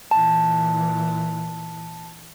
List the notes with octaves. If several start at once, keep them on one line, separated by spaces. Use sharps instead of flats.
A#2 E3 A5